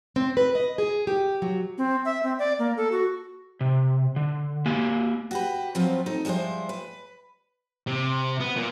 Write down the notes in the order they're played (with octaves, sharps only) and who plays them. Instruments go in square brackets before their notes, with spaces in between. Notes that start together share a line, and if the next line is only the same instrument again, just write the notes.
[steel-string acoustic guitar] C4
B4
D#5
G#4
G4
F#3
[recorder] C4
E5
C4
D5
A#3
A4
F#4
[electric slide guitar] C3
D3
A#3 G4 G#5
[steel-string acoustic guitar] F#4 G4 B4
F3 F#3 B3 C4 F4
D#4 A4
F3 G3 G#3 E4 C5
B4
[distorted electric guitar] C3
B3
A#2